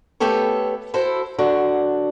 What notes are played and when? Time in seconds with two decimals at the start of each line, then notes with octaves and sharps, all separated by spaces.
0.20 A3 B3 G4 A4 C#5
0.94 E4 F#4 A4 C5
1.39 D3 F#3 D4 F#4